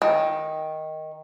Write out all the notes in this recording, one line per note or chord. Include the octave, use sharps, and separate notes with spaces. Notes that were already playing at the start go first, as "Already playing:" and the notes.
D#3